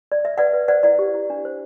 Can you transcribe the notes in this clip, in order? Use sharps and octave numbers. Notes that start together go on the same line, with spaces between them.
D5
E5
B4 D5 F#5
B4
C5 D5 F#5
E4 D5 F#5
G4
E4
D4
C5